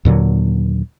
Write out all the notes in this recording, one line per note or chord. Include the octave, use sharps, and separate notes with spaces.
D#2 A#2 D3 F#3